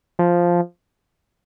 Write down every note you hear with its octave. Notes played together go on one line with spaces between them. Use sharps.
F3